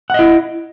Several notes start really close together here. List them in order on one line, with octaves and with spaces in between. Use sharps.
F#5 D#5 E4